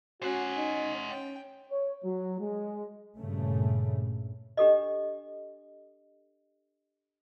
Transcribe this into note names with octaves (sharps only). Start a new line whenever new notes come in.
C#4 F#4 C5 F#5
D#4
C#4 G5
C#5
F#3
G#3
G2 A#2 C#3 A3
D4 G4 A4 D#5